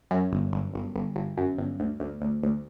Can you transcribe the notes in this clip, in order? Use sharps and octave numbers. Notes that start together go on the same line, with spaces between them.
F#2
G1
G1
G1
G1
G1
F#2
G1
D2
D2
D2
D2